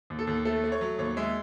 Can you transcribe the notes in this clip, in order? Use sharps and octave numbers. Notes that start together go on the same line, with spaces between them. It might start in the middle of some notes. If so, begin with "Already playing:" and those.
D#2
A4
D#2
A3 A4
A3
C#5
F#3
D#2 C#5
G#3 E5